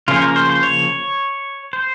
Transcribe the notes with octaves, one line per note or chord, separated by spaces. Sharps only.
C#3 F3 A#3 C#4 F4
C5
A#4
C5
C5
C#5
C5